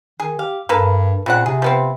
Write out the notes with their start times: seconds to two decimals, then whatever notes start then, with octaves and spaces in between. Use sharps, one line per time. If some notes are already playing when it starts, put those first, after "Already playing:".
0.20 D#3 G#4
0.39 G4 F5
0.69 G2 A#3 A4 B4
1.26 A#2 C#3 C4 F#5
1.46 C3 G#4
1.62 F3 B3 C4